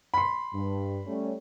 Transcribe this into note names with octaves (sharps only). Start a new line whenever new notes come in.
B5 C6
G2
G3 A3 C#4